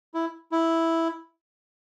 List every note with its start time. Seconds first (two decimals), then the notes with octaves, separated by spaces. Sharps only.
0.14 E4
0.52 E4